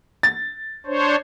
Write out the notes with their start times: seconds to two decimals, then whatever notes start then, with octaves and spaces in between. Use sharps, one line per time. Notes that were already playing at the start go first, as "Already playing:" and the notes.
0.23 A6
0.86 D4 C5 C#5